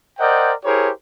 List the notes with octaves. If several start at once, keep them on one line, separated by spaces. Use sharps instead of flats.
A#4 C5 D5 D#5 F#5 G5
E4 G4 G#4 A#4 C5 C#5